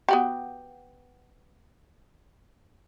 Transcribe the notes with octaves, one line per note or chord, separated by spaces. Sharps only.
B3 F#4 G4